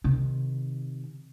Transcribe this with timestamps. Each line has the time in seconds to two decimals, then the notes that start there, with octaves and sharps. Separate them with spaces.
0.04 C3 D#3